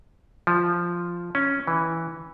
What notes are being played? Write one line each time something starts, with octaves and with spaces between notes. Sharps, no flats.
F3
C#4
E3